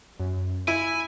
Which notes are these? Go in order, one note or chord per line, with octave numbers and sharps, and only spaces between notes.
F#2
E4 G#5 B5